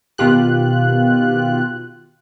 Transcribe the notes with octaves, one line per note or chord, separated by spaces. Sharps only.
B2 D#3 F4 G4 F#6